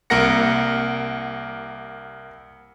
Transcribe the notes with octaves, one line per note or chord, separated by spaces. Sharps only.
C2 A#3 A#4 F#5 A#6 C#7